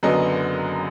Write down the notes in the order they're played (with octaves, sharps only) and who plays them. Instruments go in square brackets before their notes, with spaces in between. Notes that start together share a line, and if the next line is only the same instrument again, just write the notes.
[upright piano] F#1 F#2 D3 F#3 B3 D#5